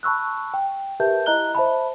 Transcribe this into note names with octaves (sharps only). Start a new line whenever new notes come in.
A5 B5 C#6 E6 F#6
G5
G4 A#4 B4 E5 A5 G6
E4 D#5 A#5 F#6 G7
C5 E5 A5 B5